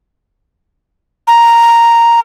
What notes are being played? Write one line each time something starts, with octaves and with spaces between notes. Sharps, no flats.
A#5